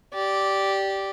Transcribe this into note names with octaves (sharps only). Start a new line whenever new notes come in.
G4 D5